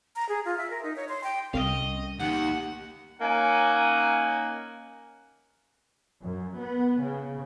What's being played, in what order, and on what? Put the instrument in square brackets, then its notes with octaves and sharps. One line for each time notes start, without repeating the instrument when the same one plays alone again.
[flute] A#5
G#4
F4
E5
A#4
D#4
C#5
C6
G5
[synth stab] C2 [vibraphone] G3 C#4 G5 [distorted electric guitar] D#5 F5
[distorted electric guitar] D#2 D#3 [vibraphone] G4 [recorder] F#5
[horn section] A#3 C#4 D#4 F#5 G#5
[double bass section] F#2
B3
C#3